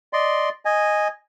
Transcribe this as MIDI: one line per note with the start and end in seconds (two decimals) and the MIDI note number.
0.13 0.49 74
0.13 0.49 75
0.13 0.49 84
0.65 1.08 75
0.65 1.08 80